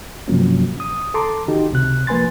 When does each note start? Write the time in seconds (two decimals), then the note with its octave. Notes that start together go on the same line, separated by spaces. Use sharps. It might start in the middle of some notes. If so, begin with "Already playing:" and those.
0.28 G2 C3 F3 F#3 A#3 C#4
0.80 D#6
1.14 A4 A5 A#5 C6 D6
1.48 D#3 D#4 F#4 G4
1.70 C#2 C3 F#6
2.07 F3 A#3 B4 G#5 C6 A6